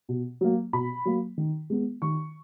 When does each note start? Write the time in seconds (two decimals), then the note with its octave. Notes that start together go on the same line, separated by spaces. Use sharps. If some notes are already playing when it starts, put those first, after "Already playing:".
0.09 B2
0.41 F#3 A#3
0.73 B2 B5
1.05 F#3 A#3
1.38 D#3
1.70 G#3 B3
2.02 D#3 C#6